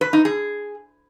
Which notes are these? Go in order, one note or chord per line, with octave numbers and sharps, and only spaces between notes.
B4
D#4
G#4